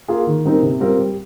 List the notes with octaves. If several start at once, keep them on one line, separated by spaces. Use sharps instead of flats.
A#3 F4 G#4
D#3
G3 C4 D#4 A#4
C3
G3 C4 F4 A#4
G3